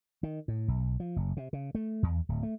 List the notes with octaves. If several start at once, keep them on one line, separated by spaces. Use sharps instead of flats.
D#3
A2
B1
F3
F#1
C3
C#3
A3
E2
D1
A3